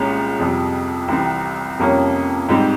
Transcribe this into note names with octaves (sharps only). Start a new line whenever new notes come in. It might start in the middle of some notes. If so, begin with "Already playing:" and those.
Already playing: C2 A#2 G#3 C#4 G4
F2 C3 G3
C2 C3 E3 G3 C4
F2 C3 G3 A#3 C#4
G#2 G3 C4 G4